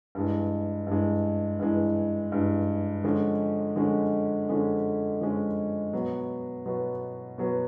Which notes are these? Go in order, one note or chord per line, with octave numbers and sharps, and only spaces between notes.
G2 E3 G#3
G2 E3 G#3
G2 E3 G#3
G2 E3 G#3
D3 F3 G#3 C#4
D3 F3 G#3 C#4
D3 F3 G#3 C#4
D3 F3 G#3 C#4
B2 F#3 B3
B2 F#3 B3
B2 F#3 B3